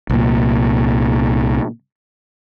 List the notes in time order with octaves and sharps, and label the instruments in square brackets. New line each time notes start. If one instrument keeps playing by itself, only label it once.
[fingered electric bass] C2 A#2